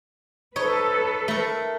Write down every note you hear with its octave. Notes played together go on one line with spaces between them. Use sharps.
D#4 A4 B4 C#5
A3 A#4